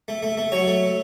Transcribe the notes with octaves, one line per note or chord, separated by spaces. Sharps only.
A3
A3
A3
F#3 C#5
A3